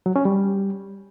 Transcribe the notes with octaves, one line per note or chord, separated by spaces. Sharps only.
F#3
C#4
G3